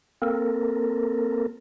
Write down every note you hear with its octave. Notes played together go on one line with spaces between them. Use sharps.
A#3 C4 A4 A#4